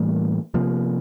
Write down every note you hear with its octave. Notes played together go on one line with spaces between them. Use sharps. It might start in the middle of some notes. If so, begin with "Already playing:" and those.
Already playing: A2 E3 G3 A#3
C3 F3 A#3